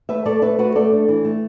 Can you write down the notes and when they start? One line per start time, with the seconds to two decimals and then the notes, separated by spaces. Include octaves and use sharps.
0.09 A3 B4 E5
0.25 A3 A4 D5
0.42 A3 B4 E5
0.59 A3 F#4 B4
0.75 A3 A4 D5
0.92 D4
1.08 E3
1.25 A3